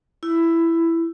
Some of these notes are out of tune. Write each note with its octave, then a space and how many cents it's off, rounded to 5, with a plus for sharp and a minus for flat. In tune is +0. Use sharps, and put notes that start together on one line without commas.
E4 +10